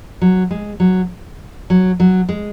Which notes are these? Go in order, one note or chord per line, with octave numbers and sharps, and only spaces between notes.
F#3
G#3
F#3
F#3
F#3
G#3